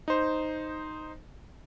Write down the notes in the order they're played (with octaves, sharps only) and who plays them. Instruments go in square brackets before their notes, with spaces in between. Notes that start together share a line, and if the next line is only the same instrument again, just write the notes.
[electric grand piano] D#4 C5